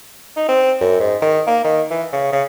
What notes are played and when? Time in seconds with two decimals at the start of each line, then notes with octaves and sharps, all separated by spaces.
0.36 D#4
0.49 C4
0.81 F#2
1.00 G#2
1.22 D#3
1.47 A#3
1.64 D#3
1.90 E3
2.13 C#3
2.32 C#3